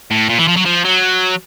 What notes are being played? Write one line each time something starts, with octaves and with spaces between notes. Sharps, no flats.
A2
A#2
E3
F3
F#3
F3
F#3